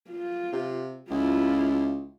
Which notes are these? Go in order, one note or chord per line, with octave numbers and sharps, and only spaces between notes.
F4
C3
C#2 E4 F4